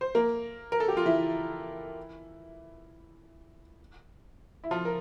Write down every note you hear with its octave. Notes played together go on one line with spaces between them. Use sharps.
C5
A#3 A#4
A#4
A4
G4
F4
E3 E4
E4
F3 F4
A#4